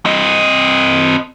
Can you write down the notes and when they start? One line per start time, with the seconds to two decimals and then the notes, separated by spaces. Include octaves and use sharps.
0.06 C4 D#5